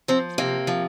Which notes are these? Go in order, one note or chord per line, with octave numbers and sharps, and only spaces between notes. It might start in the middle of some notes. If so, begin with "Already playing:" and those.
F3 C4
C3 A#3
F3